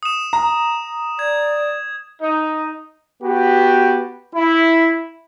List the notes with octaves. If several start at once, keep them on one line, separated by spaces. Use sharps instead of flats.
D#6 E7
A#5
D5 G#6
D#4
B3 F#4 G4
E4